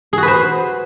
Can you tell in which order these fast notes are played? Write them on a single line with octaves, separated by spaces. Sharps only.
G#4 F#4 B4 C5